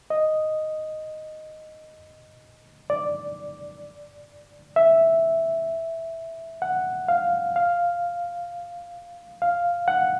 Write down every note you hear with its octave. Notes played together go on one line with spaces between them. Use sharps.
D#5
D5
E5
F#5
F5
F5
F5
F#5